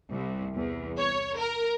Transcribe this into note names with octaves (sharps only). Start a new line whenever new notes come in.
C2
E2
C#5
A#4